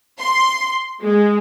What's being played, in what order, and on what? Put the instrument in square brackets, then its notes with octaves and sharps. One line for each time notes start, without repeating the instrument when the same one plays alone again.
[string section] C6
G#3